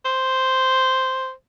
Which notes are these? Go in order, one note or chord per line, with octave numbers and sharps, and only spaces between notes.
C5